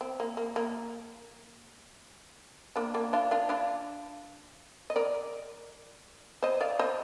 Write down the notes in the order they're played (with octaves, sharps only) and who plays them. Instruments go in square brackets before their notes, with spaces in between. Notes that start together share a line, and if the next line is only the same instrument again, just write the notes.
[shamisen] C4
A#3
A#3
A#3
A#3 D4
A#3 D4
D4 F4
D4 F4
D4 F4
D#5
A#4 D5
C5 D#5
D5 F5
C5 D#5